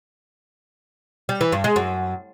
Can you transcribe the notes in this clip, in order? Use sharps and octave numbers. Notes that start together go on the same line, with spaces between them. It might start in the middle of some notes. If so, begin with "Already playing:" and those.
G3
E3
G2
G#3
F#2